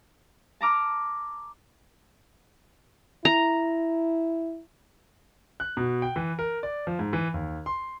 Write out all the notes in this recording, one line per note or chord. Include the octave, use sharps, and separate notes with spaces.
A5 A#5 D6 F6
E4 A#5
F#6
B2
G5
E3
A#4
D5
F3
G#2
E3
D#2
C6